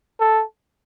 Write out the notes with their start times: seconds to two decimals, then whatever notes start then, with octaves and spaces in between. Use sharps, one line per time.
0.20 A4